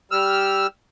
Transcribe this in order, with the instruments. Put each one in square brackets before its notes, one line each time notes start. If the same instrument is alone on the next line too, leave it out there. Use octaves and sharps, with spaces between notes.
[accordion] G3 E6 F6